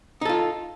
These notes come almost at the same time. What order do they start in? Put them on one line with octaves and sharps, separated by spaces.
D#4 A4 F4